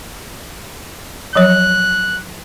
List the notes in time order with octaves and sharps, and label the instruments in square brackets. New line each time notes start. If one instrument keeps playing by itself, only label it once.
[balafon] F3 F#3 C#5 [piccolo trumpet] F#6